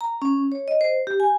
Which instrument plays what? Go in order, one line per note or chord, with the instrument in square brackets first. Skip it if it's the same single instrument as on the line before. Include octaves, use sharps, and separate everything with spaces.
[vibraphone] A#5
C#4
C#5
D#5
C5
G4
G#5